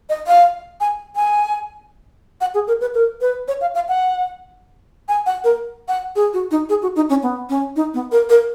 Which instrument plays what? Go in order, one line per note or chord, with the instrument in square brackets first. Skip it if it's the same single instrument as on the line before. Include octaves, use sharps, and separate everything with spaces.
[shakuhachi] D#5
F5
G#5
G#5
F#5
G#4
A#4
B4
A#4
B4
C#5
F5
F5
F#5
G#5
F#5
A#4
F#5
G#4
F#4
D#4
G#4
F#4
D#4
C#4
B3
C#4
D#4
B3
A#4
A#4